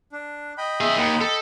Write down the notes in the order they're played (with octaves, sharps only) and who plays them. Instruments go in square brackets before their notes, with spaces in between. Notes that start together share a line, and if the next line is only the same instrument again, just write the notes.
[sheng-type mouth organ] D4
D#5 G5 B5
[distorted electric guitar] G#4 E5
D#2
A4